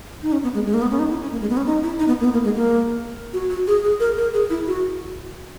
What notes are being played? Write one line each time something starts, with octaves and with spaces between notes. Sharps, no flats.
D#4
C#4
B3
G#3
G#3
A#3
B3
C#4
D#4
E4
C#4
A#3
G#3
B3
C#4
D#4
E4
D#4
B3
A#3
B3
A#3
G#3
A#3
F#4
F#4
G#4
G#4
A#4
A#4
G#4
E4
F#4